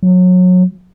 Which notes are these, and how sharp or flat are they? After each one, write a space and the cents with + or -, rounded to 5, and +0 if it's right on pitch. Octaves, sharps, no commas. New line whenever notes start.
F#3 -25